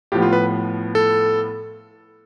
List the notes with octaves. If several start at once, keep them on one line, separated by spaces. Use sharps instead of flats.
A2 F3 B3 G4
F4
B4
A4